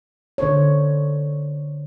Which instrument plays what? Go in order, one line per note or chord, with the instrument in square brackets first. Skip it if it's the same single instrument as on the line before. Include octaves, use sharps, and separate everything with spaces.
[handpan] D3 C5 C#5